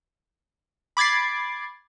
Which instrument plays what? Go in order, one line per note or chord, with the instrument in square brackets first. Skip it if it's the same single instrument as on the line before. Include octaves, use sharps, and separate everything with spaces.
[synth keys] B5 D6 G#6 A6 C7